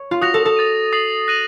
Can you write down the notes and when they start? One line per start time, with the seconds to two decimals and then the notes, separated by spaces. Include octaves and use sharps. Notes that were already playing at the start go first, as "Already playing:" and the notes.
Already playing: C#5
0.11 F4
0.21 F#4 D#6 A#6 F7
0.34 A4
0.45 A4
0.57 D#6 A6 D#7
0.93 D#6 A6 C7 F#7
1.28 F#6 A#6 D#7 F#7